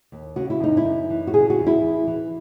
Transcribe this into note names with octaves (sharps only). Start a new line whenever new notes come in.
D#2
C#3 F#4
E4
F#2 D#4
E4
F#2
E3
F#4
C#3 G#4
F#4
E2
E4
E2
E3